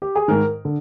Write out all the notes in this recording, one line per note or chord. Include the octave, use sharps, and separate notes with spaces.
G4
G#4
G#2 D#3 A#4
D3